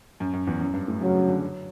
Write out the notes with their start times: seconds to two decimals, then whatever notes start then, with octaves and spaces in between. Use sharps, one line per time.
0.20 F#2
0.33 F#2
0.47 E2
0.61 F#2
0.74 G2
0.88 A2
1.01 C#3 F#3
1.14 C#3
1.28 D3
1.42 F#3